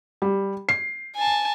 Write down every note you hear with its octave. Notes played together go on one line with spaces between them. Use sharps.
G3
C7
G#5 A5